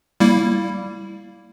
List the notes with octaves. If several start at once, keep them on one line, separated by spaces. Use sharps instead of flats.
G3 A#3 E4